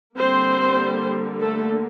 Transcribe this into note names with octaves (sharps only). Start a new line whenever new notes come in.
D3 G3 A#3 C4 C5
A3 A4